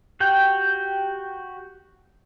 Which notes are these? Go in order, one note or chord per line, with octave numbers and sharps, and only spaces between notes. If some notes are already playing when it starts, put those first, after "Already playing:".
F#4 G4 G5